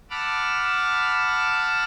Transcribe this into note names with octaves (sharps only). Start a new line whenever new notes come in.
F#5 A5 B5 D6 E6 F6